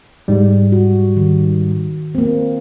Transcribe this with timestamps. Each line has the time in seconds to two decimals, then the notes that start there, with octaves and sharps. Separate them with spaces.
0.28 G#2 G3
0.72 F#4
1.17 D#3
2.15 A#3 C4